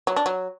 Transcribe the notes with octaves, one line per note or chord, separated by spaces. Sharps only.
F#3
D4
F#3